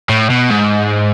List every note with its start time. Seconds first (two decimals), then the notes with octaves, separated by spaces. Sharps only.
0.09 A2
0.30 B2
0.50 G#2